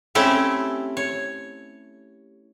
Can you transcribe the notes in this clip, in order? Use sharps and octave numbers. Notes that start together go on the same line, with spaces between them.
A3 C4 C#4 E4 G4 A4
C#5